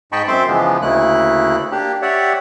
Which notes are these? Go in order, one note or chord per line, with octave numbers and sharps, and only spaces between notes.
G#2 D#5 G5 A5 B5 C#6
F#2 C4 C5 E5 C6 D6
C#3 E3 F3 G#3 B3
D2 C#3 A3 A#3 E4 F#6
A#3 D4 G4
G4 C#5 D5 E5 F#5